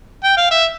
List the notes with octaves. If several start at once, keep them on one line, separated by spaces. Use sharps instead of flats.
G5
F5
E5